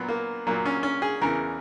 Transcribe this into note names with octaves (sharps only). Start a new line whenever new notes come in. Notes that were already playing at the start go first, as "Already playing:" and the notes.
Already playing: A#2 F#3 B3
A#3
A#2 F#3 A#3
C#4
C#4
G#4
E2 C#3 E3 A#4